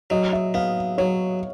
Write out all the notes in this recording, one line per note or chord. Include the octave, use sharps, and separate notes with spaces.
F#3 D#5
E5
B3 F5
F#3 C#5